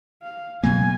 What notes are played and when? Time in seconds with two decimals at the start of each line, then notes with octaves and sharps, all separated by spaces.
0.22 F5
0.63 B2 F#3 A#3 G#5